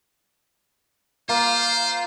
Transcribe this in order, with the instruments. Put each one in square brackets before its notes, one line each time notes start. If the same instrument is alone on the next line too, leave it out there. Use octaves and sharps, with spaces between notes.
[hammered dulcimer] A#3 [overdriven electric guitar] F4 [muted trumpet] C5